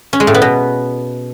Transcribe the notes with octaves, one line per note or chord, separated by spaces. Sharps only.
C#4
G#3
A2
B3
B2